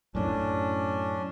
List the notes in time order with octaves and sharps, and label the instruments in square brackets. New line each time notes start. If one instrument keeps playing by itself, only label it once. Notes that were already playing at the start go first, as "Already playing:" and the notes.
[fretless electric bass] F#2 A2 [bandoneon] C#4 D4